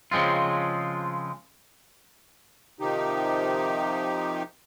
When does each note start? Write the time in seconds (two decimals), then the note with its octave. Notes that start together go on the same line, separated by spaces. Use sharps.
0.11 C#3 F3 G#3 C4 F4
2.80 C3 D#3 F3 D#4 G4